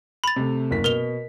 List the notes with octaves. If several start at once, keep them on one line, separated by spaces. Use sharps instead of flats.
B5 A6 F7
C3 A3
F#1 A#3 B6
B2 A#4 F7 G7